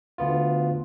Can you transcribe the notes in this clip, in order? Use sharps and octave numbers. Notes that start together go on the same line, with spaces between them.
D2 B3 F4